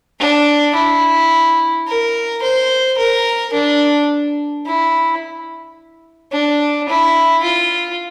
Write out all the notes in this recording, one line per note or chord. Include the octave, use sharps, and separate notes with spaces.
D4
E4
A#4
C5
A#4
D4
E4
D4
E4
F4